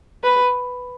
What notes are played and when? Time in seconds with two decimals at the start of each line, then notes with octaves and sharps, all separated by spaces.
0.24 B4